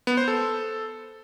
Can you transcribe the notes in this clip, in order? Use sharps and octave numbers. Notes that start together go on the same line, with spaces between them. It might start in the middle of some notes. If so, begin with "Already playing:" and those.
B3
C5
A4